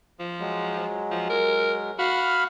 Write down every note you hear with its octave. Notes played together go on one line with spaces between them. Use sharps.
F3
F#3 G#3
F3
A#4
F#4 F5 B5 F6